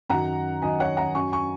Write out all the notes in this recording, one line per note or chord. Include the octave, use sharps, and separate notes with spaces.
F#2 D#3 F#3 F#5 A#5
F#2 D#3 F#3 D#5 G#5
C#5 F#5
F#5 A#5
F#2 F#3 C#4 G#5 C#6
G#5 C#6